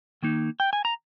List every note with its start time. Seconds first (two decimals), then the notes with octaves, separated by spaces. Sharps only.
0.23 D#3 A#3 D#4
0.60 G5
0.73 G#5
0.85 A#5